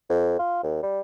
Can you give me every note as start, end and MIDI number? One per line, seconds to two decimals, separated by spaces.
0.10 0.37 41
0.39 0.63 65
0.63 0.80 39
0.83 1.01 55